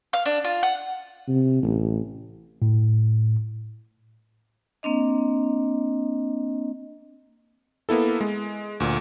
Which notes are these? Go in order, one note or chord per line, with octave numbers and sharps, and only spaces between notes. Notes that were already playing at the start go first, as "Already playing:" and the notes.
F5
D4
F4
F#5
C3
A1
A2
A#3 C4 D4 D#5
A#3 B3 E4 A4
G#3
D2 A#2